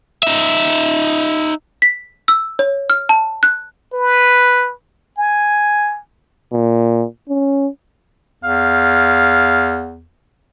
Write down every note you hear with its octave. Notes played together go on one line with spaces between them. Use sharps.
D#4 E5
B6
E6
C#5
F6
A5
F#6
B4
G#5
A#2
C#4
E2 F5